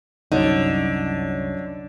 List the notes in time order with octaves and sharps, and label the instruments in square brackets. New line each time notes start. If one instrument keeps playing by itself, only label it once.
[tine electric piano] C2 [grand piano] F#2 C#5 D#5 [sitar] D3 [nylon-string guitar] D#4